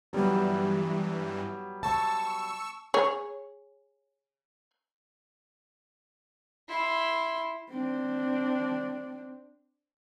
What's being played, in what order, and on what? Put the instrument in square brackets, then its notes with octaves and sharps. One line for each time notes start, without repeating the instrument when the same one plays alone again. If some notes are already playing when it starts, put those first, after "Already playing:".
[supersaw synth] G2 E3 [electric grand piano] F#3 G3 B3
[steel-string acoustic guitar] A5 [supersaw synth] C#6 E6
[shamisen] G#4 C#5
[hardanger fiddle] E4 C6
[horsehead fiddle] C4 D4